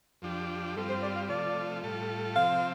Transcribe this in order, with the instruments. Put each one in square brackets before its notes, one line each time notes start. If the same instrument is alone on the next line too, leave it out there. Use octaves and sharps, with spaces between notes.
[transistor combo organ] F2 F3 D4 G4
[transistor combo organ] G2 G3 C4 F4 [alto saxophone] A4
[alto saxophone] C5
D5
F5
[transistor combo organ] C3 F3 A3 F4 [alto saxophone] D5
[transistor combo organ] A2 G3 F4 A4
[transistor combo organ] C3 F3 C4 [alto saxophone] F5